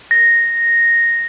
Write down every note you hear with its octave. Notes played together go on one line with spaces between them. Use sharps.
A#6